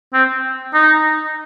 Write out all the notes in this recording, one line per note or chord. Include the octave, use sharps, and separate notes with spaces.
C4
D#4